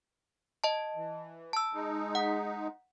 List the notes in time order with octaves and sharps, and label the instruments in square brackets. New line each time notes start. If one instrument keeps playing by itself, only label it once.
[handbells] D#5 A5
[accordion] E3
[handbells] A5 E6
[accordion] G#3 D#4
[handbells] F#5